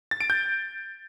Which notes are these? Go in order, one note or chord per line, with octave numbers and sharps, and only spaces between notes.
A6
D7
G6